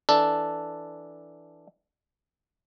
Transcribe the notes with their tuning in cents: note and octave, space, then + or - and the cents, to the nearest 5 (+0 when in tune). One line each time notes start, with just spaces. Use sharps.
E3 +0 D4 +0 A4 +0